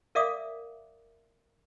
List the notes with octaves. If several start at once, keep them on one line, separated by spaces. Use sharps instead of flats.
A#4 D5 E5 F5 D6 D#6